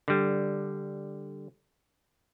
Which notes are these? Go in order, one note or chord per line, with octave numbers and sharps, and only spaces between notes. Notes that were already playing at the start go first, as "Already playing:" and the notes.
D3 G3